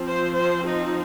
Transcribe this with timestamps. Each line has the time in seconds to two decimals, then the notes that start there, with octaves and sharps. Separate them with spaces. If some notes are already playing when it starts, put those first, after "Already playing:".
Already playing: F3 C4
0.08 C5
0.37 C5
0.67 D#4